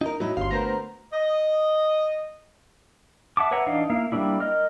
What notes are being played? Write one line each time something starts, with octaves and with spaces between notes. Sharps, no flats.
D#4 A#4
A2 F#3 D#4 E4
G1 F5 C6
D3 A3 B3 A#4 C5 A#5
D#5
E5 F#5 A5 D6
B4 C#5 E5 F#5 A#5
E3 D4 D#4 F5
A#3 E4 F5
G3 A3 A#3 D4 E4
A#4 D#5 F6